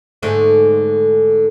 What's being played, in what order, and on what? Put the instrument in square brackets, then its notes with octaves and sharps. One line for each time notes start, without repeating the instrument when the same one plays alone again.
[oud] G#2 D3 A3